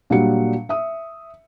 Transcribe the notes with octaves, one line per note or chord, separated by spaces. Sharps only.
A#2 F#3 G3 D4 F#5 C#7
E5 D#6